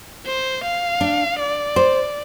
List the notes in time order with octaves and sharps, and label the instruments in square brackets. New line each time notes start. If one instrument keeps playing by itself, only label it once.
[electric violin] C5
F5
[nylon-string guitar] D4
[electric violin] D5
[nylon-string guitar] C5